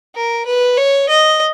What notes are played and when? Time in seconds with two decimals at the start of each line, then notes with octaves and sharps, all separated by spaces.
0.15 A#4
0.46 B4
0.77 C#5
1.09 D#5